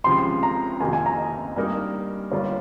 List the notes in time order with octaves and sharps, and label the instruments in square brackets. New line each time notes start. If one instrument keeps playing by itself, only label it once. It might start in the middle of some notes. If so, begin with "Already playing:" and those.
[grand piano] C#2 C#3 F3 C4 G4 [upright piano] C6
[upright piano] A#5
[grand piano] F2 C3 D#3 A#3 [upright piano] G#5
[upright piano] G#5
A#5
D#5
[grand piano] G2 G3 A#3 D#4 A#4
[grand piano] G1 G2 G3 A#3 F4 [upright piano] C#5